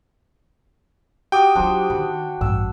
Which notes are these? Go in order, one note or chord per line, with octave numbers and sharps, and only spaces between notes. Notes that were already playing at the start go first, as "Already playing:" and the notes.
F#4 G4 G5 D6 D#6
F#3 D4 F4 C5 C#6
D#3 B5
A1 G2 B3 E6